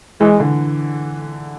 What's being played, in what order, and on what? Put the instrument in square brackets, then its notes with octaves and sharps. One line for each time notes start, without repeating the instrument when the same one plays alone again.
[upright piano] E3 [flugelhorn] G#3
[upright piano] D3